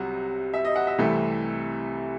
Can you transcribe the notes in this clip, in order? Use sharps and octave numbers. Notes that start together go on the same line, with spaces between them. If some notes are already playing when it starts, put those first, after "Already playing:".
Already playing: C2 C3 F#3 F#5
E5
D#5
F#5
E5
C2 C3 E3 A3